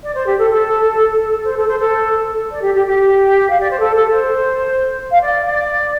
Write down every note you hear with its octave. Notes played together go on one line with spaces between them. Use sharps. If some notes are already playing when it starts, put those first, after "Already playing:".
D5
C5
G4
A4
A4
C5
A4
C5
A4
D5
G4
G4
G4
F5
D5
C5
A4
A4
C5
F5
D5
D5